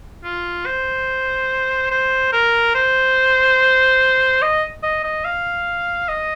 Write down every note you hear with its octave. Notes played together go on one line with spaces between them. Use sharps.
F4
C5
C5
A#4
C5
D#5
D#5
D#5
F5
D#5